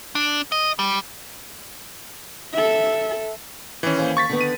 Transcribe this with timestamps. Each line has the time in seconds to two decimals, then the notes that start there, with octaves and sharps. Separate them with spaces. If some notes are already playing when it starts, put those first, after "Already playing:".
0.15 D4
0.52 D#5
0.79 G3
2.54 A4 E5
3.83 D#3 E3 C#4
3.98 D#2 C5
4.17 C#6 A6 B6
4.29 D3 D#3 B3
4.41 D#7